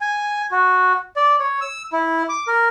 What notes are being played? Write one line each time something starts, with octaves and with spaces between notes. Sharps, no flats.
G#5
F#4
D5
C#5
E6
E4
D6
A#4